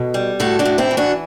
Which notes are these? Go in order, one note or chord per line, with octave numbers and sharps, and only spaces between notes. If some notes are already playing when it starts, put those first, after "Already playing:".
Already playing: B2 A4
G3
A2 F#4 A4
D4 F#4
A2
C4 E4
E3
D4 F#4